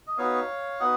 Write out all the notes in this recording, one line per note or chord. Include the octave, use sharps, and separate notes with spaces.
D#5
B3 D#4 F#4 C#5 F5
B3 D#4 F#4 D#5 F#5